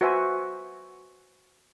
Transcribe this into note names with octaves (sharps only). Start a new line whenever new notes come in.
F#4 B4 C5 E5 F#5 G#5